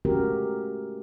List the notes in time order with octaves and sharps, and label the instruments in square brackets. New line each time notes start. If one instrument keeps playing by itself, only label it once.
[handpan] G#3 A3 C#4 F#4 G4 A#4